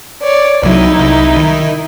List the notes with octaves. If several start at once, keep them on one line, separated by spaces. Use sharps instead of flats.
C#5 D5
C2 F#3 D#4 E4
C2
D#3